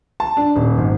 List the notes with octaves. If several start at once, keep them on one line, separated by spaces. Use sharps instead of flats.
A5
D4
D#1
G#1